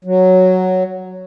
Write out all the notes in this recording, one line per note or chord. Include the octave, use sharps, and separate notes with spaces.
F#3